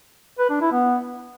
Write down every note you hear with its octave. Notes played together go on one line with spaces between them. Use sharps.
B4
D4
E4
B3